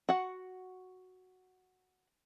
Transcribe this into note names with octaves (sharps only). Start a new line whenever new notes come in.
F#4 F#5